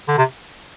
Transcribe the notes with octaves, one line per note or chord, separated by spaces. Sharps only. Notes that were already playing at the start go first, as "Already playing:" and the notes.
D3
C3